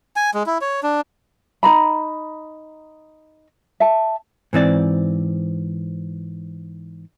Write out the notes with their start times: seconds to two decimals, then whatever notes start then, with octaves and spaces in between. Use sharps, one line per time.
0.16 G#5
0.34 G#3
0.46 E4
0.61 C#5
0.83 D4
1.63 D#4 B4 A#5 B5
3.80 E5 A5
4.53 G#2 E3 C4 D5